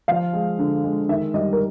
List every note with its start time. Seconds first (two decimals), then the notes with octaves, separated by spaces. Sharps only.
0.08 F3 F5
0.33 G#3
0.59 D3
0.84 G#3
1.09 D#3 E5
1.34 G3 D#5
1.53 A#4